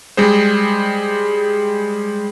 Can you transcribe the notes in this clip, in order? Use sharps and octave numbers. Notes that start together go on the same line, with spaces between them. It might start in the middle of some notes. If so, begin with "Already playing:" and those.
G3 G#3 G#4 C5